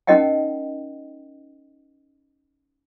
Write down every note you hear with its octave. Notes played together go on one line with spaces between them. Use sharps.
C#4 D#4 A#4 D#5 F#5 G5